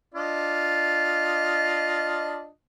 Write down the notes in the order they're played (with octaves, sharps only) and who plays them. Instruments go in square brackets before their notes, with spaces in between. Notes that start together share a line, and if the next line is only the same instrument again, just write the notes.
[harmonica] D4 F4 D#5